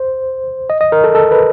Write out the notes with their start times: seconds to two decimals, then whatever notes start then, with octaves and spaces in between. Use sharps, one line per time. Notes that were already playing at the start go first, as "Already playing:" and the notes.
Already playing: C5
0.70 D#5
0.81 D#5
0.92 A#4
1.04 A4
1.15 A4
1.31 B4